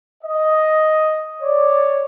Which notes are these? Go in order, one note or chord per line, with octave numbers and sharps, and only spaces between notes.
D#5
C#5 D5